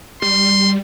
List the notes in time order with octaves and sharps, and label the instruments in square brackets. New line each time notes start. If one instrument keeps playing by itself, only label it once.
[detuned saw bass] G3 [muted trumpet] C6